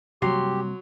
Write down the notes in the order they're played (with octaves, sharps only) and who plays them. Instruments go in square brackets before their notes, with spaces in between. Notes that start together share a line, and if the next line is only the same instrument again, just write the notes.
[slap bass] C3 G3 A#3 [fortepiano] F#3 [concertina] G4 [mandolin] C6